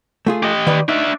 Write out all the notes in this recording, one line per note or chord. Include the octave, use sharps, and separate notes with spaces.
A3 F4 G#4
G4 D#5
D#3 B4 D5
D4 D#4 E5